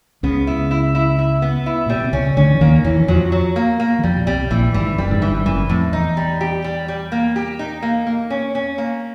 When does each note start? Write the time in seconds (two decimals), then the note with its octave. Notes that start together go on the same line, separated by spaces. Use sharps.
0.23 C#2 C#3 B3
0.47 E4
0.71 E4
0.95 E4
1.19 E4
1.42 B3
1.66 E4
1.86 A#2 G3
1.95 B2
2.04 C3
2.13 C#2 C#3 C#4
2.37 D2 D3 C#4
2.54 E3
2.61 D#2 D#3 A#3
2.84 E2 E3 C#4
3.00 E3
3.08 F2 F3 F#3
3.32 F#3
3.56 A#3
3.80 A#3
3.99 E3
4.04 F2 F3 G3
4.16 B2
4.26 C2 C3 G3
4.51 A#1 A#2 E3
4.74 G#1 G#2 E3
4.93 F2
4.98 F#1 F#2 G3
5.11 G#2
5.21 G1 G2 E3
5.46 F#1 F#2 E3
5.69 F2 A2
5.93 E2 D#4
6.17 G3
6.41 G4
6.64 G3
6.88 G3
7.12 A#3
7.36 G4
7.59 D#4
7.82 A#3
8.06 A#3
8.30 C#4
8.55 C#4
8.78 A#3